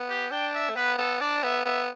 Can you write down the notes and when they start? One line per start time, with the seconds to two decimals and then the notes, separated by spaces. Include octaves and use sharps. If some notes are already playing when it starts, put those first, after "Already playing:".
Already playing: B3
0.10 G4
0.31 D4 G5
0.54 E5
0.69 A3
0.76 B3 B4
0.98 B3 A4
1.20 D4 D5
1.43 B3 E5
1.65 B3 E5